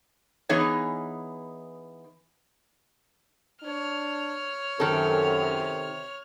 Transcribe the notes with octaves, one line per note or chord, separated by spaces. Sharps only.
E3 B3 D#4 G#4 C#5
D4 C#5 F6
F#2 C3 D#3 A4